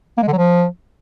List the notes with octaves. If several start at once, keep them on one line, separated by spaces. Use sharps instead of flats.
A#3
G#3
D3
F#3
F3